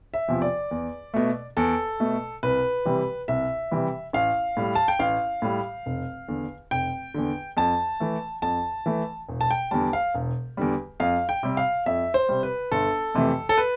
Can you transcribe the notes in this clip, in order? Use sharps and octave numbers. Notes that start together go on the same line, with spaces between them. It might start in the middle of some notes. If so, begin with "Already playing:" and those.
E5
E2 C3 F3
D5
E2
B2 A3
E2 A4
B2 A3
C2 B4
C3 E3 G3
C2 E5
C3 E3 G3
A1 F5
A2 G3
A5
G5
A1 F5
A2 G3
F1
E2 D3
F1 G5
E2 D3
F2 A5
E3 A3
F2 A5
E3 A3
E1
A5
G5
E2 D3 G3 A5
F5
E1
E2 D3 G3
F2 F5
G5
C3 G3
F5
F2 E5
C5
C3 G3
B4
G1 A4
F2 C3 E3 A3
A4
B4